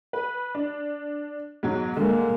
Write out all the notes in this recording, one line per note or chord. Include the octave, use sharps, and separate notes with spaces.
B4
D4
G#2 B2 F#3
D3 G#3 A#3